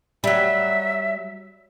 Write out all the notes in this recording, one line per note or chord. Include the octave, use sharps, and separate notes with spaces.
F#3 G3 E5